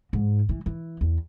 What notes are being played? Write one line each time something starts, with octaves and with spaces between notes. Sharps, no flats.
G#2
E3
E3
E2